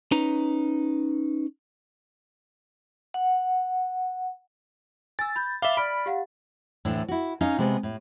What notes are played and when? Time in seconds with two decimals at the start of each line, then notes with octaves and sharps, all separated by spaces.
0.11 C#4 D#4 B4 A#5
3.14 F#5
5.19 G#5 E6 A6
5.36 B5 G6
5.62 E5 F5 B5 D6 G7
5.77 D5 B5 F6 D7
6.06 G4 F5 F#5
6.85 D2 A2 E3 D4
7.08 E4 F#4
7.41 C#4 D#4 D#5 F5
7.58 C3 G#3 B3
7.83 A2